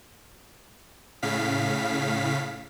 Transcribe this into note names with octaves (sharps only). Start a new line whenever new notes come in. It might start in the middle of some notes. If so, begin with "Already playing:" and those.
A2 C#3 F5 B6